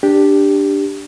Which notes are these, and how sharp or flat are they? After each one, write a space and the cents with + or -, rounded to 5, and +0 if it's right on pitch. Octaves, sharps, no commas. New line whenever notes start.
D4 +0 G4 +0